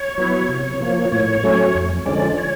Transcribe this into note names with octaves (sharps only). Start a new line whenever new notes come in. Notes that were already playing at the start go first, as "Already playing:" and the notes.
Already playing: C#5
F#3 B3 E4
C3
F3 A#3
A2 C#5
F#3 A3 C#4
F2
D3 F3 G#3 C#4 D5
C#5